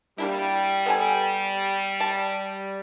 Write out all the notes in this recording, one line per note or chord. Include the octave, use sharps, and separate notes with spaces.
G3 A#3 D4 E4
B3 A4 G#5
A5